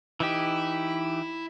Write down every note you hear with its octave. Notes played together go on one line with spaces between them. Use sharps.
E3 D#4 E4 G4